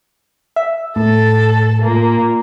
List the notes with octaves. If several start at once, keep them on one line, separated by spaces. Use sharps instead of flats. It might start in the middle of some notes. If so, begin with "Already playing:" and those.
E5
A2 A4 A5
A#2 A#3